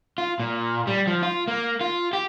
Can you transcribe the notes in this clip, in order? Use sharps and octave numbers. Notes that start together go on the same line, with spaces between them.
F4
A#2
G3
F3
F4
A#3
F4
G4